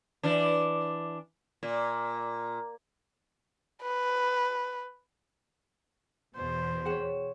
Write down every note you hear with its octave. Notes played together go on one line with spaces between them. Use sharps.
E3 D4
A#2
B4
E2 B2 C5
G#4 C#5 F#5 G5 E7